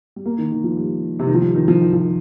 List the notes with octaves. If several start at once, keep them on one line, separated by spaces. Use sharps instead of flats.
G3
A#3
D#3
D#3
F3
G3
C3
D#3
F3
G3
D#3
F3
D#3
F3
D#3